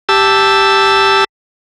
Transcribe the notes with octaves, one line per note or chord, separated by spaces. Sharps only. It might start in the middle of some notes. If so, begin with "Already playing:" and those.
G4 A5 E6